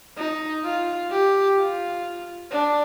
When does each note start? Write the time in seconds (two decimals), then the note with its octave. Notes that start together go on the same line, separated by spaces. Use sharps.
0.18 D#4
0.64 F4
1.11 G4
1.58 F4
2.51 D4